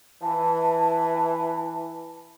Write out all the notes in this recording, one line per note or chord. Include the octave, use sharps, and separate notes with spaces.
E3 A5